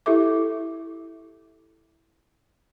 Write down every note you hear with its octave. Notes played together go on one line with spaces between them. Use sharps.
E4 G4 A4 E5 D6